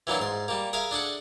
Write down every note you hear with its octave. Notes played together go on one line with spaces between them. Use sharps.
E3 F#3 A#3 D4
G#2 C6
G3 A#3
G#4 A#4 E5 F5
D4 G#4 A4 F#5